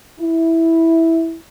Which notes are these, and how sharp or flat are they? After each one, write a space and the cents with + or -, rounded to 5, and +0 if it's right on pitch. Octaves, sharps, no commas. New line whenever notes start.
E4 -5